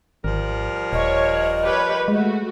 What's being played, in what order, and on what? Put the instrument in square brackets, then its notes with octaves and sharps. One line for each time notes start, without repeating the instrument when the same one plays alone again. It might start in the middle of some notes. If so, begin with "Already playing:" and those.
[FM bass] G#1 [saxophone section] F3 G3 A#4
[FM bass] D#1 [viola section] C#5 [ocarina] D#5
[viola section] G4 B4 C#5
[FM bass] G#3 [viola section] A3 F#4